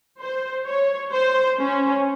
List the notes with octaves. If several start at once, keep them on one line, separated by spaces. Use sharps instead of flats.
C5
C#5
C5
C#4